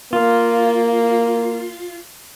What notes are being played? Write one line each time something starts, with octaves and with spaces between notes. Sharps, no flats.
A#3 F4